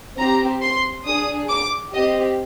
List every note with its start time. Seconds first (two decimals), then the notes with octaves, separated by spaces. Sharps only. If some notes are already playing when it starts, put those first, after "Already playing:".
0.18 C4 G4 A#5
0.61 C6
1.06 D4 G#4 D#6
1.49 D6
1.93 C4 G4 D#5